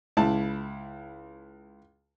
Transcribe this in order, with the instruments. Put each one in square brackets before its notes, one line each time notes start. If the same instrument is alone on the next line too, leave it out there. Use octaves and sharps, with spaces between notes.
[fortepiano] C#2 E4 A5